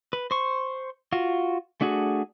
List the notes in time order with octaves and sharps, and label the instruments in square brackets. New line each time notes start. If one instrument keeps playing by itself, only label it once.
[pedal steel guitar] B4
C5 C#6
F4 F#4
A3 D4 F#4 G#4